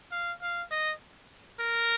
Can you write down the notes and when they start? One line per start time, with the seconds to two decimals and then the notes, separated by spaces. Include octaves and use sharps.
0.11 F5
0.42 F5
0.71 D#5
1.60 A#4